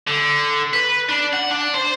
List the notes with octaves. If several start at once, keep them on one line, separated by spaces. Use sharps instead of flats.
D3
B4
D4
F#5
D4
C5